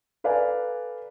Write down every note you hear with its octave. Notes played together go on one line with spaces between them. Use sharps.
A4 B4 D5 F5 G#5 A#5